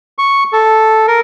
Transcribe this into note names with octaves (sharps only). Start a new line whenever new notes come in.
C#6
A4
A#4